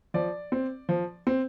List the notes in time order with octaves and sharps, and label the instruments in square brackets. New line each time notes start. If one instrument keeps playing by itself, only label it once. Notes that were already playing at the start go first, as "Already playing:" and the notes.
[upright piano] F3 D5
C4
F3
C4